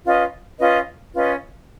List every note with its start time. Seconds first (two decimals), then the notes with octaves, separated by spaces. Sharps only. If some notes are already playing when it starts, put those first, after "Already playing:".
0.04 C#4 F4 B4 D#5
0.58 C#4 F4 B4 D#5
1.14 C#4 F4 B4 D#5